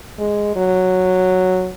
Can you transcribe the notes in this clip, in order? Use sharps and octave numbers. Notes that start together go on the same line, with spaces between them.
G#3
F#3